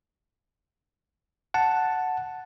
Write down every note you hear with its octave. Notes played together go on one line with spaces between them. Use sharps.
F#5 A5